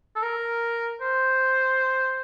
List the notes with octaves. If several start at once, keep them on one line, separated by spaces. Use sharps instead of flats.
A4
A#4
C5